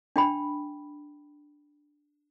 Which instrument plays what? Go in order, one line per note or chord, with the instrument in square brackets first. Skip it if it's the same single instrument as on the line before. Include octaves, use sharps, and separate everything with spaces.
[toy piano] D4 G5 B5